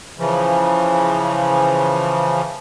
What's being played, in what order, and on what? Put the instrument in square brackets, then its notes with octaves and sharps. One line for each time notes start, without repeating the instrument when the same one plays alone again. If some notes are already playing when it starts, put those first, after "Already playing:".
[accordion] C#3 E3 F3